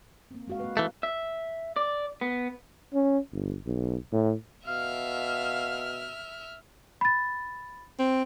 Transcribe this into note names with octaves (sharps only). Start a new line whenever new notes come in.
A#3 C4
G#3 F#4 F5
A#3 B4
E3 A3
E5
D5
B3
C#4
G1
B1
A2
B2 E5 F5 F6
B5 A6
C4